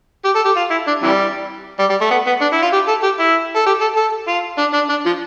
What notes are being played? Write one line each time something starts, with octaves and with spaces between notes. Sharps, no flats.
G4
A4
G4
F4
E4
D4
C3 E3 G3
G3
G3
A3
B3
B3
D4
E4
F4
G4
A4
G4
E4
A4
G4
A4
A4
F4
D4
D4
D4
F3